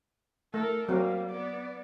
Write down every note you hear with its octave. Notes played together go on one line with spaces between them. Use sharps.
A3 A4 A#4
F#3 G3 A#3 C4
B3 D5